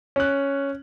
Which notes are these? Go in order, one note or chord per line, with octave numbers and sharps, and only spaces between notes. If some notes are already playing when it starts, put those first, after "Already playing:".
C#4 F#6